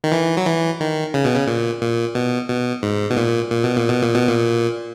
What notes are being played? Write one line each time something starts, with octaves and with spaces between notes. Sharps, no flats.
D#3
E3
F#3
E3
D#3
C#3
B2
C#3
A#2
A#2
B2
B2
G#2
B2
A#2
A#2
B2
A#2
B2
A#2
B2
A#2